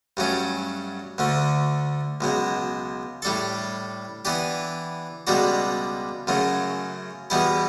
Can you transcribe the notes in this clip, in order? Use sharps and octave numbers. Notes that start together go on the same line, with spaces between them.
G2 F#3 A3 C#4
D2 D3 A3
C#2 B2 F#3
A2 G3 D4 A4
E3 B3 D4 G4
C#2 B2 G3 D4 F#4
F#2 C#3 F#3 A3
E2 B2 G3 B3 E4